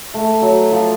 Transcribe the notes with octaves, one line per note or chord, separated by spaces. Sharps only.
A3
F#3
F3